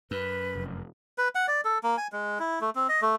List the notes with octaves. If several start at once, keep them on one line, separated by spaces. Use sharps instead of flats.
F#2 B4
F1
B4
F#5
D5
A4
A#3
G#5
G#3
E4
A3
C4
D#5
A3